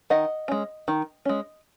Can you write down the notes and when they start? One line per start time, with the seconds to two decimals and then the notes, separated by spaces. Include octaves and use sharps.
0.10 D#3 D#5 F#5
0.48 G#3 C#4
0.88 D#3
1.25 G#3 C#4